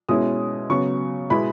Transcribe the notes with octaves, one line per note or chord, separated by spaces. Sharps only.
B2 G#3 C#4 E4 D#6
C#3 F#3 B3 C#6
B2 G#3 B3 E4 B5